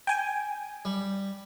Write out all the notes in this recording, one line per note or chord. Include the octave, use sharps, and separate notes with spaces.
G5 G#5
G3